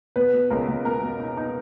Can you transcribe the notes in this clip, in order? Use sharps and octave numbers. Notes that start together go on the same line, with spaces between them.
B2 B3 B4
B2
C#2 A#4
C#2
B2 A#4
B2
D#4
D#4